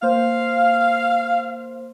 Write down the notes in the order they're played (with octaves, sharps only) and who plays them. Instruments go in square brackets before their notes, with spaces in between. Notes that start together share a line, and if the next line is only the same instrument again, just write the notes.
[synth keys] A#3 C5 [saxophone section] F5